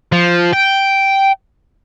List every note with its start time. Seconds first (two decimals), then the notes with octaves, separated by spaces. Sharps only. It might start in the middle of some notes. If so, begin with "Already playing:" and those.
0.12 F3
0.53 G5